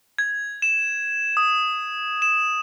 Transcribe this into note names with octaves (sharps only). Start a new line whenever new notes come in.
G#6
E7
D#6
E7